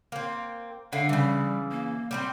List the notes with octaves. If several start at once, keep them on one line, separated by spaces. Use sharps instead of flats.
A#3 C4
D3 A3 F5
C#3 E3 G3
A#3
G3 A#3 C4